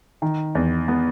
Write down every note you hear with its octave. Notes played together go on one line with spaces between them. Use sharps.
D#3
E2
B3